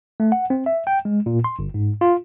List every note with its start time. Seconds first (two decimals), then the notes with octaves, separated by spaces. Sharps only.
0.20 A3
0.32 F#5
0.50 C4
0.66 E5
0.87 G5
1.05 G#3
1.26 A#2
1.44 C6
1.59 G1
1.74 G#2
2.01 F4